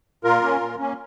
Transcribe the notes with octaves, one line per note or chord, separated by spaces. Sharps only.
A#2 F4 A#4
A#3 C#4
A#2
A#3 C#4